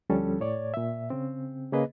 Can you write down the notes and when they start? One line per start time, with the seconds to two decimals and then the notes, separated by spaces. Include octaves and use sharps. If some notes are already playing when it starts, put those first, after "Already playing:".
0.10 D2 F3 G3 C#4 A4
0.40 A2 C#5 D5
0.74 A#2 E5
1.10 C#3 C4
1.73 C#3 A#3 G#4 B4 D#5